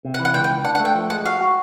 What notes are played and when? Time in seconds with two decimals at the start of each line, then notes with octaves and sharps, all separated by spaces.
0.05 C3
0.14 F#5
0.19 E3
0.25 F#5
0.34 C#2 G5
0.44 G5
0.50 C#2
0.65 D4 F#5
0.75 F#5
0.80 A3
0.85 G5
0.95 F3
1.10 G#3 F#5
1.25 F#4 F5
1.41 F#4